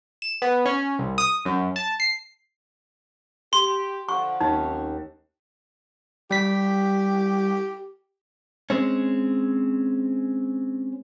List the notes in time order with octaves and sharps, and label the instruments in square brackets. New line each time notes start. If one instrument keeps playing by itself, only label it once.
[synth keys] E7
B3
C#4
C2
D#6
F#2
A5
C7
[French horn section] G4 [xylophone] C6
[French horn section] D3 F3 [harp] F#5 [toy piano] C#6
[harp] D#2 [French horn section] F3 C4 C#4 [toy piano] D#4
[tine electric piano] G3 B6 [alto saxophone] G4
[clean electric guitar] G#3 C4 C#4